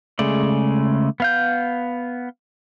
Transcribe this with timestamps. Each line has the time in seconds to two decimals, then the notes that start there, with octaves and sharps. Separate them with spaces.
0.19 C#3 G#3 A3 D5
1.20 B3 F5 G6